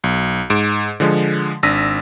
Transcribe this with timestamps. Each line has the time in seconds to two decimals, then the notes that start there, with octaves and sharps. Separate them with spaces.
0.04 B1
0.50 G#2 D7 E7
1.00 D3 F3 G#3
1.63 G#1 D4 E6 A#6 B6 D#7